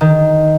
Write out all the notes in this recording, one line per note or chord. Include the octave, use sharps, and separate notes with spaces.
D#3